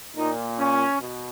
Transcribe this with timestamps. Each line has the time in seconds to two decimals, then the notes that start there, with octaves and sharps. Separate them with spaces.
0.15 A#2 D#4
0.58 C#4
1.00 B2